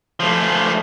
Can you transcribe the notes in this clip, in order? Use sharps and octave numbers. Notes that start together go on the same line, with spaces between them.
F3 A3